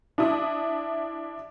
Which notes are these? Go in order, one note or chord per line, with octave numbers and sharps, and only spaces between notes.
D4 E4 D#6